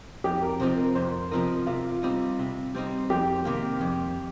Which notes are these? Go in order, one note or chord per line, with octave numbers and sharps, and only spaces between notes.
F2 G4
A#4
C3 F3 C4 D#4 C5
A#4
F2 C5
C3 F3 C4 D#4 A#4
C3 F4
G3 C4 D#4
C3
G3 C4 D#4
F2 G4
C3 D#3 A#3
F2